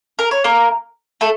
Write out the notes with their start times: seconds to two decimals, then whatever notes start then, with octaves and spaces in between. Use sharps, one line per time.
0.19 A#4
0.31 C#5
0.44 A#3 A#4
1.21 A3 A4